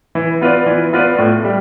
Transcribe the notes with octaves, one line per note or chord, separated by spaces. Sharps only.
E3
B3 F4 B4 D5
E3
B3 F4 B4 D5
A2
G3